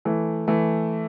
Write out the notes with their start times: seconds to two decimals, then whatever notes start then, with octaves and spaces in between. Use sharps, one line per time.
0.05 E3 A3
0.48 E3 A3